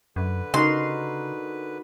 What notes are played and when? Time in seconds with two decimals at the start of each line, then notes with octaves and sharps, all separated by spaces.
0.16 F#2 D3 B4
0.54 C#3 D#4 F#4 A#4 C6